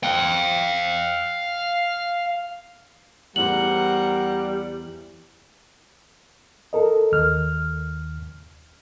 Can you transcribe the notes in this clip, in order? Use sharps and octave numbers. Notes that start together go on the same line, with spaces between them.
F5 G5
E2 G3 A#4 C5 F#5 F#7
A4 A#4 D#5
D#2 F6